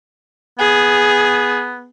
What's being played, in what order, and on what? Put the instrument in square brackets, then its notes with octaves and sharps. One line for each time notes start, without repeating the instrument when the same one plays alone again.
[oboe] B3 [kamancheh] G#4